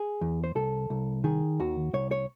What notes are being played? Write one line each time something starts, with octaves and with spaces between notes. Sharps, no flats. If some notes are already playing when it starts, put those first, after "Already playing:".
Already playing: G#4
E2
C5
C2 A4
C2
D#3 G#4
D#2 F#4
C2 C#5
C#5